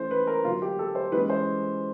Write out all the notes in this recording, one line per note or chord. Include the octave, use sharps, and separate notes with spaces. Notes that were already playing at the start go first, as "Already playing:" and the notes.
Already playing: E3 A3 C#4 C5
B4
A#4
D3 F#3 B3 F4
G4
A4
C5
E3 G#3 C#4 B4
C5